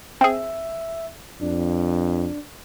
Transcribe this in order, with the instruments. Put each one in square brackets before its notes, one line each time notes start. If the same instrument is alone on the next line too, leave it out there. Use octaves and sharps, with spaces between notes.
[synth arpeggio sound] C4 G#4 [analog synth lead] E5
[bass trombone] F2 [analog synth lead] D4